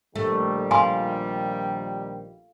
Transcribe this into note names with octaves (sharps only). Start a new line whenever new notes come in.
A#1 D#3 G3 A3
F4 G#5 C6